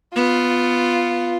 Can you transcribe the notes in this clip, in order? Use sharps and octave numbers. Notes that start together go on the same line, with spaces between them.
B3 F4